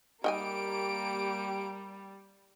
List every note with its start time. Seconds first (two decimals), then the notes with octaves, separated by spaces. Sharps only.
0.24 G3 A#3 D#4 G4 G5 G#5 D7